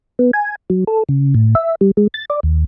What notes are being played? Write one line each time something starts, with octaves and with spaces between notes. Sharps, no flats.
B3
G#5
F#3
A4
C#3
A2
E5
G3
G#3
A6
D5
D#2